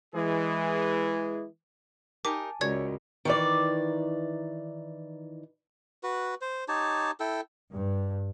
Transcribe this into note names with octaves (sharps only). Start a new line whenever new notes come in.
E3 G#3 G#4
D#4 G4 A#4 G#5 A5 D6
C#2 C#4 F#4 A#4 C#5 D5 G#6
D#3 E3 D5
F#4 B4
C5
D#4 G4 C#5 A5
E4 A4 G5
G2